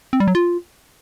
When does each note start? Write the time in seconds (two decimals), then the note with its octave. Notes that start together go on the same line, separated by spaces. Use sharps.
0.13 C4
0.20 G3
0.28 F#3
0.35 F4